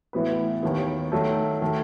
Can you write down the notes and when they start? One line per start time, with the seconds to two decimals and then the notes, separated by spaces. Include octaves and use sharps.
0.13 A2 E3 B3 F#4 B4
0.63 D#2 D#3 F#3 B3
1.12 D#3 F#3 A3
1.62 D#3 A3